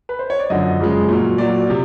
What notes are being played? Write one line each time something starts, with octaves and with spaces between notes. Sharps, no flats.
B4
C5
C#5
D5
F#2 D3 F3 D#5
F#2 C#3 F3 G#3
A#2 F#3
A#2 F#3 D5
C3 F3